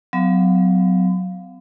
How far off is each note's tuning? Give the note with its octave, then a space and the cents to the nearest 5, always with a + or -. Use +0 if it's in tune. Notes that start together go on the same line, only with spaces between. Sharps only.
F#3 +0 B3 +45 F5 +0